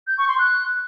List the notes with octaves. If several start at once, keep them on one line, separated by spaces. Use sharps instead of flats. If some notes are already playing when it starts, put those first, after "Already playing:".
G6
C#6
C6
F#6